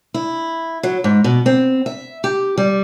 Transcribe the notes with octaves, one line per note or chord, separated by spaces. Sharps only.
E4
F#3
G#2
B2
C4
E5
G4
G3